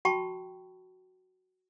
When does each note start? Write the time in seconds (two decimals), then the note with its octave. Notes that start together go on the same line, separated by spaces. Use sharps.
0.05 F#4 G5 A5 B5 C#6